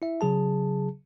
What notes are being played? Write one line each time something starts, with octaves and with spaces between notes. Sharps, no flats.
E4 E5
C#3 F#3 G#4 A5